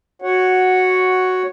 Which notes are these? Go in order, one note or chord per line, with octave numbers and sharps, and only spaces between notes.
F#4 C#5 F#5